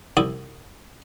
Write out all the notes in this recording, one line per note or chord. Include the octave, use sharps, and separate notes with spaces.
C2 E4 D5 D#6